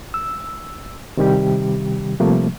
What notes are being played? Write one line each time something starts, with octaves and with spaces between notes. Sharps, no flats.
E6
C3 D#3 G3 G4
C3 F3 G3 A3 A#3